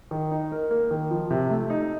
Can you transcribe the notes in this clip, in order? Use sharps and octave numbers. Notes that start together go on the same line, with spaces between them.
D#3
D#4
A#4
A#3
D#3
F3
C3
A3
D#4